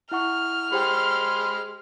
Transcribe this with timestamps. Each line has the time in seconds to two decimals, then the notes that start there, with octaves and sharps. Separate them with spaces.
0.12 E4 F#5 C#6 F6
0.72 G#3 G4 C5 G5 B5 C6